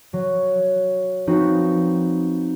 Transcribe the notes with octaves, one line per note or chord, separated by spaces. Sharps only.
F#3
F3 B3 C4 D#4 F#4